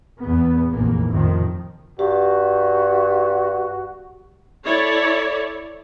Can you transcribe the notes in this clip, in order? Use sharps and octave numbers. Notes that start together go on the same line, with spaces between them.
E2 B3
F1 A#1 E3 A#3
F2 A2 C3 D#3 F3
G2 F#4 G4
E4 A4 C#5 D5